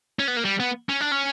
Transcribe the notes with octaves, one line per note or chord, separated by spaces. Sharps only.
C#4
B3
A#3
G3
B3
C#4
D4
C#4